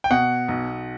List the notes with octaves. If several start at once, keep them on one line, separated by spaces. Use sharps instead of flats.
G5
B2 F#5
B1